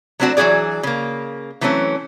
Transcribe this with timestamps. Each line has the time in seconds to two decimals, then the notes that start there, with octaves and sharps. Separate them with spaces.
0.20 F#3 A3 C4 D4 F#4
0.37 E3 F#3 B3 F#4 G#4 D5
0.83 C#3 A#3
1.61 E3 F#3 A3 C4 C#4